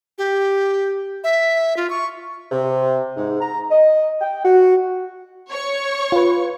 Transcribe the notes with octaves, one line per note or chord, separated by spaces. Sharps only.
G4
E5
F4
C#6
C3
G#2
A#5
D#5
G5
F#4
C#5 C#6
F4 B4